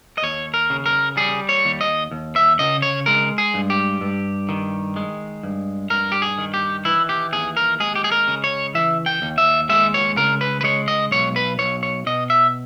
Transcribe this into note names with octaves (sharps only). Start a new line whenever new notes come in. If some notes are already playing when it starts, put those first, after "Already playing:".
D#5
D#2 C#5
A#4
C#3
A#4
G3 G#4
C#5
D#2
D#5
D#2
E5
C#3 D#5
C#5
G#3 A#4
G#4
G2
G4
G2
D#3
G#3
G2
G2 A#4
G4
G#4
D#3
G4
E3 E4
G4
D#2 G#4
A#4
G#3 G#4
G4
G#4
A#4
C#3
C#5
E3 E5
G5
D#2
E5
G#3 E5
C#5
C#3 A#4
B4
B4
G#3 C#5
D#5
B1 C#5
B4
B1 C#5
C#5
B2 D#5
E5